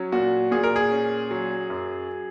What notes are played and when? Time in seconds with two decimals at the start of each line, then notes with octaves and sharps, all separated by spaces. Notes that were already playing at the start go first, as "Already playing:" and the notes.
Already playing: F#3 C#4
0.12 A#2 F#4
0.51 A#2 G#4
0.64 A#4
0.76 G#4
0.91 C#4
1.31 F#3
1.70 F#2